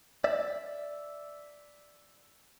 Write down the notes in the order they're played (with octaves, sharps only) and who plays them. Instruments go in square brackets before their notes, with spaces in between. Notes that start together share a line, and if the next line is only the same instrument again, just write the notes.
[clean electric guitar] D5 E5